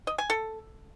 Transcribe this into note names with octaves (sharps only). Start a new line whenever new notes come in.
D#5
G#5
A4